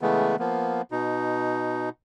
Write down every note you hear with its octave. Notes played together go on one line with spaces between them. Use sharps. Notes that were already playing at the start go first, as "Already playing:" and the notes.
C#3 E3 G#3 A3 B3
F3 A#3 B3
B2 D#4